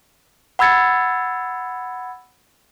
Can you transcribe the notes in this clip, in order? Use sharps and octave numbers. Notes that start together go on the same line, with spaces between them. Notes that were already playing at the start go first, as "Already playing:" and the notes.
F#5 B5 E6 G#6 A6 C#7